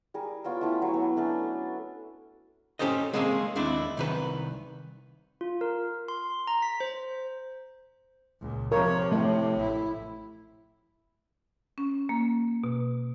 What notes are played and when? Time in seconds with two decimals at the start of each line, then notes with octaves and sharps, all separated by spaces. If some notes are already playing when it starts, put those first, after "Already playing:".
0.14 G3 G#4 A#4
0.44 B3 F4 C#5 G5
0.61 A3 C#4 E4 G4
0.82 F#3 C#5 G#5
0.94 B3
1.16 A3 C#4 D4 A4
2.79 C#4 D#4 G4 A4 C5 D#5
3.13 G#3 A#3 C4 C#4 F#4 G#4
3.56 D#2 C4 D4 E4 D5
3.97 C2 D#3 B4
5.41 F4
5.61 A#4
6.08 C6
6.47 A#5
6.62 B6
6.80 C5
8.41 C#2 A#2
8.72 C3 F3 A#4 C#5
9.12 A2 A3
9.55 A1 E4
11.78 C#4
12.09 A#3
12.64 B2